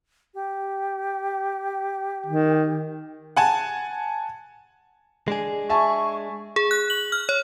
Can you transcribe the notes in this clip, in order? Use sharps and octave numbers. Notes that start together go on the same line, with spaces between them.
G4
D#3
F#5 G#5 A5
G#3 D4 G#4
E5 G#5 A5 C#6
G#4
F#6
F#7
F6
C#5